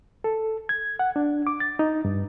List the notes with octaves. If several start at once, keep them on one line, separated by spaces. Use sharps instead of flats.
A4
G#6
F#5
D4
D6
A6
D#4
G2